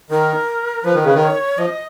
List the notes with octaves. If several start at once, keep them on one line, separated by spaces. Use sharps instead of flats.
D#3 A#4
F3 B4
D#3
C#3
D#3
C#5
F3 D#5